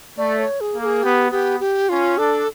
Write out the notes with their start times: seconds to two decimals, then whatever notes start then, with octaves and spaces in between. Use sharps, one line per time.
0.18 A3 D5
0.39 C#5
0.61 G#4
0.74 A#3
0.82 A4
0.86 G#4
1.03 B3 G4
1.31 B3 G4
1.60 G4
1.89 C#4 F4
2.17 D4 A4